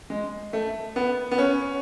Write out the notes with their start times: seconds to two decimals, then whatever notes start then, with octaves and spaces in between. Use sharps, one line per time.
0.10 G#3
0.53 A3
0.96 B3
1.31 B3
1.38 C#4